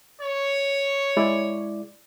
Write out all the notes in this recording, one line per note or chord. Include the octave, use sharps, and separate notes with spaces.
C#5
G#3 E4 D5